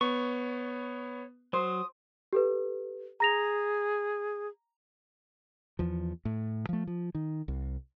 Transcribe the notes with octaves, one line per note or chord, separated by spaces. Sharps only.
B3 C#5 C#6
F#3 C5 D#6
G4 A4 B4
G#4 A#5 A#6 F7
E2 F3
A2
F3 A3
F3
D#3
C2